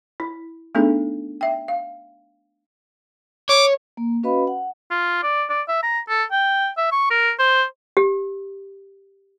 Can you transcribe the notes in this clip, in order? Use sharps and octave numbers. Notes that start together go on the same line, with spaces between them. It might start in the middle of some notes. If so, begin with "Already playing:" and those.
E4
A3 B3 D4 D#4 G#4 A4
E5 G5
F5
C#5 D6
A#3
C#4 F#4 B4 D#5 F5 B5
F#5
F4
D5
D5
E5
A#5
A4
G5
E5
C#6
A#4
C5
G4